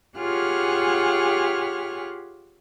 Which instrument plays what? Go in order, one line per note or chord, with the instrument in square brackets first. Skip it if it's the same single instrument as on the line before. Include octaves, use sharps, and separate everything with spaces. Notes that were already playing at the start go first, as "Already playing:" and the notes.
[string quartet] F4 G4 G#4 C#5 F#5 F6